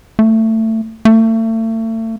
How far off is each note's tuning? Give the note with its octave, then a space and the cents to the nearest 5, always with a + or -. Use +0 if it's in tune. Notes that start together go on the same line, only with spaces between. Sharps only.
A3 +20
A3 +35